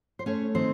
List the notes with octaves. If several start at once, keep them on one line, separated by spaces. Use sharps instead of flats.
C5
A3 C#4 C#5
D#3 C4 C5